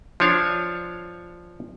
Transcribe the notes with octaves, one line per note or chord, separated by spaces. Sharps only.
F3 D4 C#5 F5